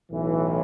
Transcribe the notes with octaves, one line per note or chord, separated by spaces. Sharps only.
B1 A2 E3